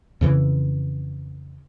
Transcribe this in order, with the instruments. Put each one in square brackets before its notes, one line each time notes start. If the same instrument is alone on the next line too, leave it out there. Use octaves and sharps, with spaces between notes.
[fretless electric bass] F2 C#3 E3